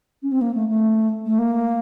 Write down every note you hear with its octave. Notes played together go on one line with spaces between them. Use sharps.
C#4
C4
A#3
A3
A3
A3
A#3